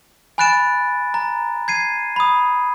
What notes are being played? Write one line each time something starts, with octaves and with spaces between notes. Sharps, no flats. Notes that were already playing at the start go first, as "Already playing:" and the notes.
G#5 B5 F#6 A6 D7 E7
A#5
G#6 C7 D#7
B5 D#6